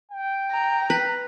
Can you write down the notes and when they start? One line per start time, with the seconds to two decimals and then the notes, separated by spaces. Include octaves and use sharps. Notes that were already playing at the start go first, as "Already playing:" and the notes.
0.11 G5
0.51 A#5
0.90 B4